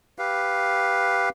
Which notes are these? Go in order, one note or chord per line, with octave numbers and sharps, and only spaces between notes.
G4 B4 F5